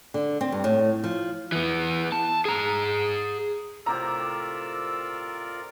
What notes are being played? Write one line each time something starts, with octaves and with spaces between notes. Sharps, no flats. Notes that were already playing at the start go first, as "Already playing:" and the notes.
D3
C4
G2
A2
F3
E3 B3
A5
G#4 A#5
A2 C3 F4 G4 A#4 D5 A#5 E6